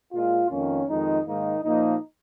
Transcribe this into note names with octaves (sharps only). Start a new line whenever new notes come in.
A#2 G#3 F4
F2 D#3 A#3 C#4
F2 D#3 G#3 D#4
G#2 D#3 A#3 D#4
A#2 F3 A#3 D#4